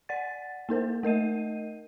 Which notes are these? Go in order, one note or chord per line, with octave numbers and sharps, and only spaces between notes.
D5 F#5 A6
A#3 D#4 A#4 C5
A3 A#4 D#5 D#7